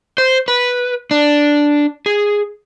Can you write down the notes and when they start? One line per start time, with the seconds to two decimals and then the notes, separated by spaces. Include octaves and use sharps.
0.18 C5
0.48 B4
1.11 D4
2.06 G#4